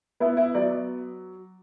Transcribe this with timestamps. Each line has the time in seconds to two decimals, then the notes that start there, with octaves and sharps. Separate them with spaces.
0.20 B3 E4
0.37 E4
0.55 F#3 D5